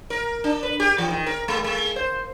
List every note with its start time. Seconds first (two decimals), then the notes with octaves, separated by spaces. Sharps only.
0.10 A#4
0.44 D4
0.63 B4
0.80 G4
0.98 E3
1.10 D#3
1.26 A#4
1.48 G#3
1.64 G#3
1.96 C5